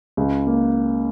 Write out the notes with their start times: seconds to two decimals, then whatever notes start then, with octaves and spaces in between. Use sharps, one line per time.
0.17 C#2
0.47 A#3